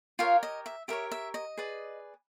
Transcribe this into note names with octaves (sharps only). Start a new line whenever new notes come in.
F4 G4 A#4 C#5 F5
D#5
E5
G4 A#4 C#5 E5
E5
D#5
G#4 B4 D5